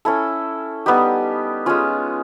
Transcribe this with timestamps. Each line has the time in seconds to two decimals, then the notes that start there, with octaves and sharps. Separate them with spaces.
0.05 C#4 E4 A4
0.86 G3 B3 D#4 G4
1.66 G#3 C#4 F4